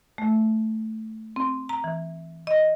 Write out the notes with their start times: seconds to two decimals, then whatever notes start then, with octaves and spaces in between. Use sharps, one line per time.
0.18 A3
1.36 C4
1.69 A#5
1.84 E3
2.47 D#5